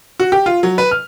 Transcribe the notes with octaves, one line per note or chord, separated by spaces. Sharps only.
F#4
G4
F4
F#3
B4
F6